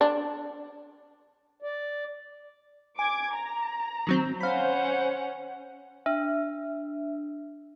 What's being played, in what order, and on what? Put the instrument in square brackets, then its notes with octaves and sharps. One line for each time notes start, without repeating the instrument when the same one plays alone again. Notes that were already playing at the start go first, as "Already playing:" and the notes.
[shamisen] D4
[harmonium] D5
[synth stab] G#5 [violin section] D6 G#6
[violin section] A#5
[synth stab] D#3 F#3 C4
[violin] C#4 F#5 [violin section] C5 G6 [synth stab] F5 B5
[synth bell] D4 [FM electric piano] E5